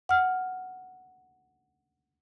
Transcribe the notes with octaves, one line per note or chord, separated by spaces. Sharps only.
F#5 F6